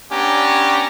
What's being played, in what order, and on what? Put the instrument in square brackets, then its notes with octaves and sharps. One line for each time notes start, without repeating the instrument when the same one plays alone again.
[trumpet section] B3 C#4 D4 G4 G#5 A#5